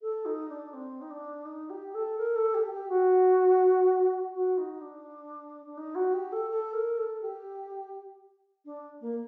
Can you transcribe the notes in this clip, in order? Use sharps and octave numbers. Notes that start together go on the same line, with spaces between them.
A4
D#4
D4
C4
D#4
D4
D#4
G4
A4
A#4
A4
G4
G4
F#4
F#4
D#4
D4
D4
D#4
F#4
G4
A4
A4
A#4
A4
G4
D4
A#3